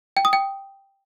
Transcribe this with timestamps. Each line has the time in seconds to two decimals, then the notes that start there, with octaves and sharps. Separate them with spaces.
0.17 G5
0.25 D#6
0.33 G5